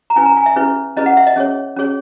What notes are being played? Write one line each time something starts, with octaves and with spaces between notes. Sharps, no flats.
A#5
C#4 E4 B4 G#5
A#5
G#5
E5
C#4 E4 G#4 B4
C#4 E4 G#4 B4 D#5
F#5
E5
D#5
C#4 G#4 C#5
C#4 G#4 C#5